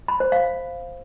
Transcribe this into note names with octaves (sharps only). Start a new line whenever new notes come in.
B5
C5
F5